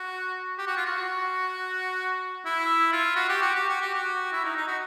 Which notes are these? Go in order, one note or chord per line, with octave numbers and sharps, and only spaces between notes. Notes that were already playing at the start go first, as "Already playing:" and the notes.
Already playing: F#4
G4
F#4
F4
F#4
E4
F4
F#4
G4
F#4
G4
F#4
G4
F#4
E4
D#4
D#4
F#4